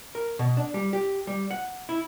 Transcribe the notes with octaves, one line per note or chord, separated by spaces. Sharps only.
A#4
B2
D4
G3
G4
G3
F#5
E4